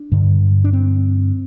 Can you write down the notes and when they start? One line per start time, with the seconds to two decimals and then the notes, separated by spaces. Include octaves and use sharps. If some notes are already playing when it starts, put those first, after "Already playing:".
Already playing: D4
0.12 G2 D3
0.64 D4
0.73 C4